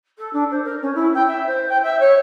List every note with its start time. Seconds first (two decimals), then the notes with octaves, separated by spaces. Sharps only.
0.18 A4
0.33 D4
0.51 C5
0.63 A#4
0.82 C#4
0.94 E4
1.14 G5
1.27 E5
1.46 C5
1.69 G5
1.83 E5
1.99 C#5